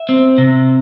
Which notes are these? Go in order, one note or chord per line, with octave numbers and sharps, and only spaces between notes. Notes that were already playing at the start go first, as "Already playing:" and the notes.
Already playing: E5
C4
C3